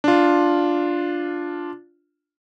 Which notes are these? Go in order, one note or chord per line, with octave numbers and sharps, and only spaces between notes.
D4 F4